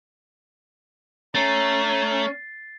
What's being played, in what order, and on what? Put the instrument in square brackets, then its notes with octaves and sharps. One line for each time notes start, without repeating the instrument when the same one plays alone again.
[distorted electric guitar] A3 [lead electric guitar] C#4 [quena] A#5 [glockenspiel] A6 C7